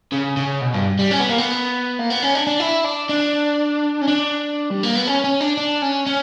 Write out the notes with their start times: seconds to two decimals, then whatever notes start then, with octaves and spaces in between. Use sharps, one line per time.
0.12 C#3
0.37 C#3
0.61 B2
0.74 G2
0.99 G3
1.11 C#4
1.20 B3
1.29 A#3
1.38 B3
1.99 A#3
2.10 B3
2.22 C#4
2.35 D4
2.47 D4
2.60 E4
2.84 D4
3.09 D4
4.02 C#4
4.08 D4
4.71 G3
4.83 A#3
4.95 B3
5.07 C#4
5.24 C#4
5.41 D4
5.57 D4
5.82 C#4
6.06 C#4